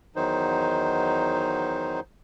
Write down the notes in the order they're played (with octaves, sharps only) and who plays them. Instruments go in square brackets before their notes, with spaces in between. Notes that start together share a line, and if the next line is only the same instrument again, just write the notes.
[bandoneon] E2 D#3 F#3 D#4 C5